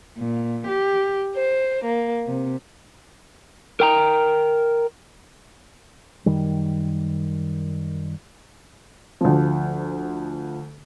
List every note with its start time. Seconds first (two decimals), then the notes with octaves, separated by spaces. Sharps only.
0.19 A#2
0.69 G4
1.35 C5
1.85 A#3
2.27 C3
3.80 A#4 G5 A#5
6.26 F#2 D#3 G3
9.21 D2 F3